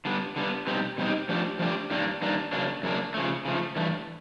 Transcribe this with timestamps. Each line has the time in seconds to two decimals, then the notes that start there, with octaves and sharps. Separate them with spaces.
0.05 D3 G3 B3
0.36 D3 G3 B3
0.67 B2 G3 C4 D#4 G4
0.98 B2 G3 C4 D#4 G4
1.29 F3 A3 D4 G4
1.59 F3 A3 D4 G4
1.91 G2 D#3 G3 A#3 D4
2.22 G2 D#3 G3 A#3 D4
2.53 F#2 C#3 F#3 A#3 D4
2.83 F#2 C#3 F#3 A#3 D4
3.14 C#3 F3 A3
3.45 C#3 F3 A3
3.76 G2 E3 A3